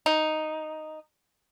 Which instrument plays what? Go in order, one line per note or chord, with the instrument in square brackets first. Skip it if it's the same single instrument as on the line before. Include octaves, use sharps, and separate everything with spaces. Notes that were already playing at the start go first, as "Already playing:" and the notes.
[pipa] D#4